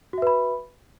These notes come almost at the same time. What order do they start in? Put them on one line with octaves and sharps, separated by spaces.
F#4 E5 B4 B5